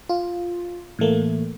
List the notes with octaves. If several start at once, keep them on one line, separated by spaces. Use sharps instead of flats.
F4
A2 E3 A3 A#3